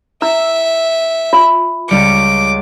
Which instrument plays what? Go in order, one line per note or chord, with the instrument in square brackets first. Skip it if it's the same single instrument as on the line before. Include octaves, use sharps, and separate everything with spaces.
[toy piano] E4 [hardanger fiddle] E5 [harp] E6
[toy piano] F4
[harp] C#2 G3 C#7 [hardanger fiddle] D6